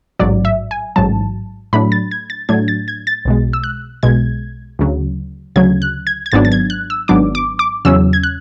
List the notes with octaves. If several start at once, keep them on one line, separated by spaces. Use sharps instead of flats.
A1 G#2 F#3 D5
E5
G#5
A1 G#2 F#3 A5
A2 F#3 A3 D4 B5
A6
G#6
A6
A2 F#3 A3 D4 G#6
A6
G#6
A6
B1 B2 G#3
E6
F#6
B1 B2 G#3 G#6
D2 C#3 F#3
D2 C#3 F#3 G#6
F#6
G#6
G#6
G#1 G#2 F#3 B3 D4 A6
A6
G#6
F#6
E6
G#1 G#2 F#3 B3 D4 D6
D6
D6
E2 C#3 F#3 C#4 E6
G#6
F#6